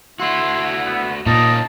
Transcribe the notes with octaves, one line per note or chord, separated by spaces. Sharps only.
A3 E4 F#4 C6
B3
A#2 A#3 C#4 D#4 D#5 A5